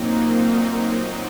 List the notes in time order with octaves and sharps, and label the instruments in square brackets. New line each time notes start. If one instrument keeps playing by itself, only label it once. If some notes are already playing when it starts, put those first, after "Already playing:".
Already playing: [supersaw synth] A#2 F#3 C4 D#4 [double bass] A#3